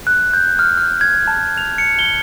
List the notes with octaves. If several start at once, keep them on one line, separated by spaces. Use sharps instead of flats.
F#6
G6
F6
F6
G#6
A5
F7
C#7
G7